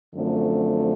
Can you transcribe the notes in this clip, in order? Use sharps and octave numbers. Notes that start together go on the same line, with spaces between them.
F#2 D3 F3 A3 C4